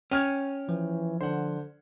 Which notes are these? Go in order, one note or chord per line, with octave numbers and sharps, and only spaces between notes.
C#4 G5 F6 G#6
E3 F3
D3 C5 F#5